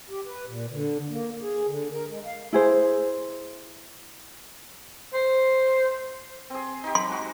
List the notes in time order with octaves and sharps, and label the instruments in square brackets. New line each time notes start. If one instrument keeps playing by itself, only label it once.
[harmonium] G4
B4
A#2
D3
A#3
G#4
D3
A#4
G#3
F5
[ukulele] E4 G#4 C5
[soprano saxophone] C5
[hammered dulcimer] C4 G#4
D#4 G4
[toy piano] C6
[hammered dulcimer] G#3 F#4